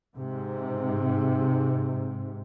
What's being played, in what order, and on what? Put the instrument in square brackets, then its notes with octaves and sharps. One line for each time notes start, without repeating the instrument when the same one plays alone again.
[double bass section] G#2 C3